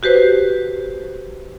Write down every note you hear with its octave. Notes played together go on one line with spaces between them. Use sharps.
F#4 G4 B4 C5